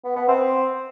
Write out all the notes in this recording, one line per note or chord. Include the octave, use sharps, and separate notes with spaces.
B3
B3
C4